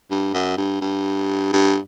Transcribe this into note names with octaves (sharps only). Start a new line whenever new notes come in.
G2
F#2
G2
G2
G2